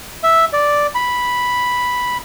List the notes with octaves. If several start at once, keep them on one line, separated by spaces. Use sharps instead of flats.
E5
D5
B5